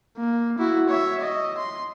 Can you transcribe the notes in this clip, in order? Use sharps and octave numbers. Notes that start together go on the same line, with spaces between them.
A#3
E4 F#4
C#5 E5
D#5
C6